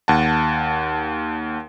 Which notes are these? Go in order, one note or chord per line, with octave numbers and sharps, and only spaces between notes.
D#2 F#5 A5